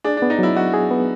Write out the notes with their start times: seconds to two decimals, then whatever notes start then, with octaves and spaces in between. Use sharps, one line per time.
0.04 D4 G#4
0.17 D4
0.22 B3
0.30 D#4
0.39 F#3 E4
0.56 D#4 F#4
0.74 G#4
0.91 B3